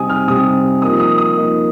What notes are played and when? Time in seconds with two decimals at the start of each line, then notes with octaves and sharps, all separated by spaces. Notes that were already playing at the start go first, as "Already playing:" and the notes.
Already playing: C3 G3 C4 D#4 G#5 D#6
0.10 F6
0.28 C3 G3 C4 D#4 D#6
0.82 F3 A#3 D#4 D#6
1.00 D#6
1.18 D#6
1.36 F3 A#3 D#4